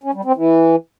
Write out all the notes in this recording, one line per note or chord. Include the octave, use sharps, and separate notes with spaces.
C#4
G3
C4
E3